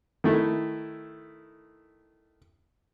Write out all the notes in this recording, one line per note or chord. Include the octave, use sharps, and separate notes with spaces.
D#3 A3 E4